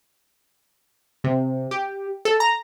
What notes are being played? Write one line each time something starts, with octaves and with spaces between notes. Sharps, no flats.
C3
G4
A4
A#5